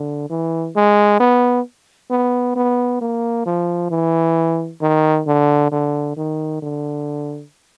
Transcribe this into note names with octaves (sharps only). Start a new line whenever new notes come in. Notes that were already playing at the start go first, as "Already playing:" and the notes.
Already playing: D3
E3
G#3
B3
B3
B3
A#3
F3
E3
D#3
D3
D3
D#3
D3